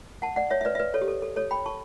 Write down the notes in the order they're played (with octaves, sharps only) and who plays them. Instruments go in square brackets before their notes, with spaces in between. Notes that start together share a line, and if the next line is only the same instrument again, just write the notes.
[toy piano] F#5 A5
D5 F#5
C#5 E5
E5
B4 D5
E5
B4 D5
A4 C#5
G4
A4
A4
A4 C#5
G5 B5
A5 C#6